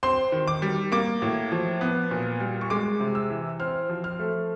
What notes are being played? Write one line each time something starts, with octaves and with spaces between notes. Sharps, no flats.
C4 C6
D#3
D6
G3
A#3 D6
A2
F3
B3
A#2
G3
C#6
G#3 D6
C3
E6
E3
C4 F6
F3
F6
A3